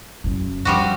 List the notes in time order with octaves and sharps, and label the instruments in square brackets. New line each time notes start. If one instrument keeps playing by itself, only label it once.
[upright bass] F#2 C#3
[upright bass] F#2 D#3 [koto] F3 G3 F#4